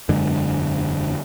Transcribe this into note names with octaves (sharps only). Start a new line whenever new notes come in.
E1 F#2 D3 G#3